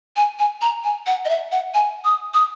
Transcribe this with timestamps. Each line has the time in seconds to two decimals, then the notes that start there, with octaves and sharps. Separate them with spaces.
0.16 G#5
0.39 G#5
0.61 A#5
0.84 G#5
1.06 F#5
1.25 D#5
1.29 E5
1.52 F#5
1.74 G#5
2.05 D#6
2.34 D#6